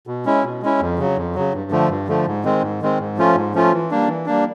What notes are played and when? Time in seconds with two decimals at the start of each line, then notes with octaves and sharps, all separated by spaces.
0.07 B2
0.25 G#3 C#4 E4
0.44 B2
0.62 G#3 C#4 E4
0.81 F2
0.99 C#3 F#3
1.17 F2
1.35 C#3 F#3
1.54 G2
1.71 D3 F3 A3
1.90 G2
2.08 D3 F3 A3
2.26 G#2
2.44 D#3 G#3 C4
2.62 G#2
2.81 D#3 G#3 C4
3.00 G#2
3.17 F3 A3 C#4 F4
3.35 G#2
3.54 F3 A3 C#4 F4
3.72 E3
3.91 G3 A#3 D4
4.08 E3
4.26 G3 A#3 D4